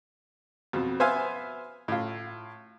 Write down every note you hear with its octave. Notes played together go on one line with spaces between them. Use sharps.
F2 B2
B3 C5 E5 F5 G#5
A2 F4